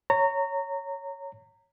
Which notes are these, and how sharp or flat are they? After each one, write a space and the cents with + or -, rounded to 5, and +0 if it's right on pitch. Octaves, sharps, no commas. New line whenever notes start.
C#5 +0 A#5 -25